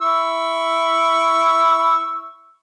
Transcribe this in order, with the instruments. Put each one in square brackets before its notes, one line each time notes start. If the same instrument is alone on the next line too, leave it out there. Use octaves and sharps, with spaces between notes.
[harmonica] E4 C#6 E6